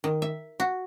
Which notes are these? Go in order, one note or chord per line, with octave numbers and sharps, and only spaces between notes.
D#3
E5
F#4